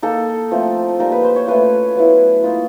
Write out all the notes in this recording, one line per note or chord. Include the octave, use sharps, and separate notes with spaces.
A#3 D#4 A4
F3 A3 C4
G3 A#3 D#4 A#4
B4
C5
C#5
A3 C#4 F4 B4
F#3 B3 E4
A#3 D#4 F4